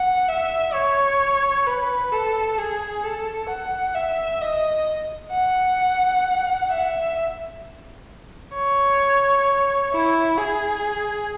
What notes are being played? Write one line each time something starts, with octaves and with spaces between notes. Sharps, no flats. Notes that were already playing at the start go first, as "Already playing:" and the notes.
Already playing: F#5
E5
C#5
B4
A4
G#4
A4
F#5
E5
D#5
F#5
E5
C#5
E4
G#4